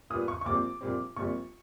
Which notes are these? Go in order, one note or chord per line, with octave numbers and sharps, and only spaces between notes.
A#2 G3 B3 D#6
C#6
C#6
A#1 A#2 G3 C4 D6
A#1 A#2 G3 C4
A#1 A#2 G3 C4 C#6